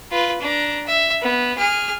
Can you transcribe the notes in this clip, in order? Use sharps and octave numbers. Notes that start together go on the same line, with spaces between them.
F4 B4
D4 A#5
E5
B3
G#4 F6